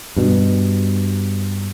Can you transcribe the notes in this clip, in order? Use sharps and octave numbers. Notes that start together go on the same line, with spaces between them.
G2 B2 G3